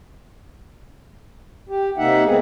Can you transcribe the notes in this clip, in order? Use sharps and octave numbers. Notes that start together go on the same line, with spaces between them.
G4
C3 A#3 D#4 E5 F#5
G#3 B3 C4 G#4